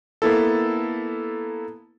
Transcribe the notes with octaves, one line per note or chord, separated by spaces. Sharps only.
A#3 B3 E4 A4